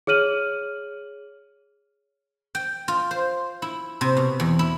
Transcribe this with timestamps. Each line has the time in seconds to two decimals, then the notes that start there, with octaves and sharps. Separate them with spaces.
0.07 G#4 C#5 F6 D#7 F#7
2.55 G5
2.88 F4
3.11 C5
3.62 E4
4.01 C3
4.17 B2
4.40 E2
4.59 E4